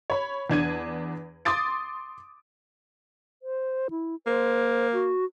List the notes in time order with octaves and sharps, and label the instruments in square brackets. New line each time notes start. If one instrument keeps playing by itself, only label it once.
[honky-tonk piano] C#5 B5
E2 D4 G#6 D#7
C6 D6 D#6 A6 D7
[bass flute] C5
E4
[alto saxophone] A#3 [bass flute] C5
[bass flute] F#4